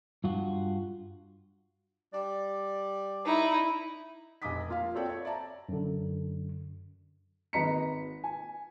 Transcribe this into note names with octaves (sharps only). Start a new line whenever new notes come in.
G2 F4 F#4
G3 D5
D#4 E4
F1 D#5 G#5 D6 D#6 B6
A#3 F4 F5
C4 F#4 A4 C#5 D5 G5
C#5
D5 E5 A5 A#5
F#2 D3
G#1 B4 D#5 A#5 B6 C#7
G#5